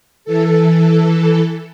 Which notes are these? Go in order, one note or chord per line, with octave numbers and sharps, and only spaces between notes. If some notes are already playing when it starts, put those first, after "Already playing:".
E3 A4